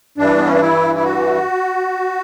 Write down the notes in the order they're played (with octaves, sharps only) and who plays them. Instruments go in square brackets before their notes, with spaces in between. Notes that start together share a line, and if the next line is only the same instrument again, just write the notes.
[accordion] G2 E3 D4
B3
C#4
D4
E4
E4
F#4